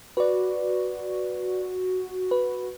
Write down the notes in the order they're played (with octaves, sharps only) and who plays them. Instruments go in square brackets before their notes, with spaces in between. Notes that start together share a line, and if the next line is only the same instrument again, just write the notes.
[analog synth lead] F#4 [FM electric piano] B4 D5
[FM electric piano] B4